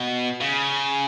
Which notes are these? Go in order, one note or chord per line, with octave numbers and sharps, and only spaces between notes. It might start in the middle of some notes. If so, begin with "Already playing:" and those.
Already playing: B2
C#3